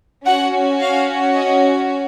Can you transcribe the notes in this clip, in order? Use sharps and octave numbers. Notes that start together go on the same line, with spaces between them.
C#4 F#4 F#5
F5
D#5